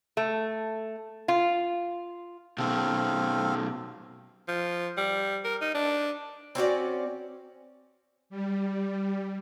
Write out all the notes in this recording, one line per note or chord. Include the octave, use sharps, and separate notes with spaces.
A3
F4
B2 D#3 C4 A4 F5
F3
G3
A#4
D#4
D4
C4 C#4 F#4 D5
G3